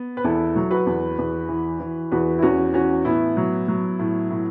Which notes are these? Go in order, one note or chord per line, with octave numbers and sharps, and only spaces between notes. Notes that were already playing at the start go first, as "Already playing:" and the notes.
Already playing: B3
B4
E2 E4 A4
F#3
F#4 B4
E2
E2
E3
E3
E2 F#4 B4
E4
E2 C#4 F#4
E3 C#4 F#4
A2 B3 E4
F#3
F#3
A2
A2